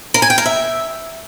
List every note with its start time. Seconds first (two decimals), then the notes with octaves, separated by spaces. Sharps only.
0.14 A#4
0.22 G#5
0.30 G5
0.38 A#4
0.46 E5